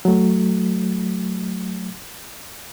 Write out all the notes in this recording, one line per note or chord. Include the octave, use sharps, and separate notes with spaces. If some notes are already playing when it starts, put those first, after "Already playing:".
F#3 A3